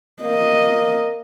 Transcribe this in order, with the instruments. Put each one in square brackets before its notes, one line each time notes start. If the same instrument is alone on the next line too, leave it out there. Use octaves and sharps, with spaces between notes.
[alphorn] A#3 [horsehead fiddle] D#5